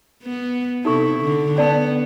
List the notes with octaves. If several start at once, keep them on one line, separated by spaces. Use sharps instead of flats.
B3
C3 D#4 E4 A4 C#6
D3
B3 C#4 D5 A5